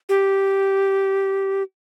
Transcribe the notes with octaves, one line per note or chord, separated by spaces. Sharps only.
G4